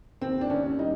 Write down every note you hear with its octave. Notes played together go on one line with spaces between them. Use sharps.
D#2 C4
D4
D#2 C#4
G3 D#4